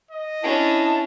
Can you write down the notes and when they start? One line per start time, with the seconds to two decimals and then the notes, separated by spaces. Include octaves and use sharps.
0.11 D#5
0.43 C#4 D4 E4 A5